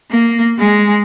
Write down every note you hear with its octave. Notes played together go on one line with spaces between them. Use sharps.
A#3
G#3